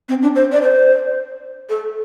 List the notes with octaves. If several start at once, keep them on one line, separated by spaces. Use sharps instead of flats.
C4
D4
C5
D5
C5
A4